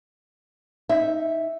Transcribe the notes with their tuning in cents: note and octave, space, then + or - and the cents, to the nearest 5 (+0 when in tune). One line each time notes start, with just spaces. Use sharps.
D#4 +10 E5 +0